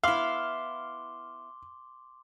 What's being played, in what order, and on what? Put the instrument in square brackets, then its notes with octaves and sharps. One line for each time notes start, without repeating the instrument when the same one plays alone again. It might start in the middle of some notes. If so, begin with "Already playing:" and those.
[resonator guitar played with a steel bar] B3 E4 [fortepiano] F5 [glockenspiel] C6 D6 G7